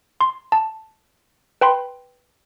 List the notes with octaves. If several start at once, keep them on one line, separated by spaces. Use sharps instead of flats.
C6
A5
B4 G5 B5 C6